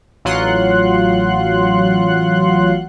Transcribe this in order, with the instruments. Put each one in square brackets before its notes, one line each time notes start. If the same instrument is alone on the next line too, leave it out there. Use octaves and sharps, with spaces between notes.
[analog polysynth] A1 F#3 F4 F#5 C6 F#6